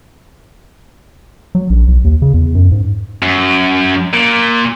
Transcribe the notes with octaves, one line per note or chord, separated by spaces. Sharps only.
F#3
A#1
B1
D#2
C#3
E2
F#2
G#2
F#2
A#2